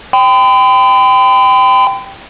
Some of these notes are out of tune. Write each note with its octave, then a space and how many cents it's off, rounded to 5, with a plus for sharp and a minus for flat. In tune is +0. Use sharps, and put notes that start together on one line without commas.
G5 +0 B5 +45